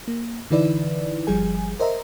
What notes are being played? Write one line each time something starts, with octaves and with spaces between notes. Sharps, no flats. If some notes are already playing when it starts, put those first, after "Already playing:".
A#3
D3 E3 D#4 E4 B4 D5
G1 F3 G3 G#4 G#5
A#4 C5 D#5 E5 A#5